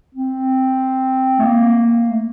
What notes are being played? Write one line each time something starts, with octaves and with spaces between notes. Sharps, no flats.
C4
A3
A#3
A3